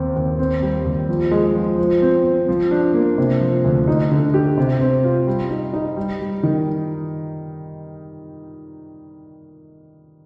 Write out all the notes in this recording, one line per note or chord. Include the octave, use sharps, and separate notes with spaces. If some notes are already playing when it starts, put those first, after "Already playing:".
Already playing: D#2 C4
D#2
C4
G3
D#2
F3
G#3
F3
F3
C4
C4
F3
D4
A#3
C3
F3
D2
D#4
D3
G4
C3
C4
F4
G3
D#4
D#4
G3
G3
D#3